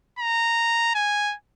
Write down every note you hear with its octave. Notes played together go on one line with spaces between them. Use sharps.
A#5
G#5